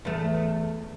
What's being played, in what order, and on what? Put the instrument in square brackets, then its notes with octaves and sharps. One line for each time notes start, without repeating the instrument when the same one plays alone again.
[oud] E2 A3